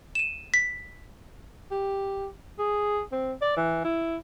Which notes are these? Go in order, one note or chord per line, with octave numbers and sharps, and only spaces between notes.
D#7 E7
B6
G4
G#4
C4
D5
E3
E4